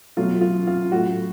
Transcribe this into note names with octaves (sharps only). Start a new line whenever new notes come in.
B2 F#3 A3 F4
F4
F4
A2 F#3 A3 F#4